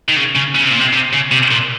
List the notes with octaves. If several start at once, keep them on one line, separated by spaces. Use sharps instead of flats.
D#3
C#3
C#3
C#3
C3
A#2
C3
C3
C#3
C3
A#2